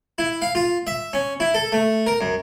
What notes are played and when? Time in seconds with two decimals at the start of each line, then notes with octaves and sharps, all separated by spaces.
0.18 E4
0.42 F5
0.55 F4
0.87 E5
1.13 C#4
1.40 E4
1.55 A4
1.72 A3
2.07 A#4
2.21 F#2